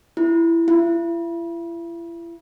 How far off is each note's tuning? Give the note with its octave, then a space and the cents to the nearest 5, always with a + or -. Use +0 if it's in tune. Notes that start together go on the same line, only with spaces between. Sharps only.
E4 +15
E4 +40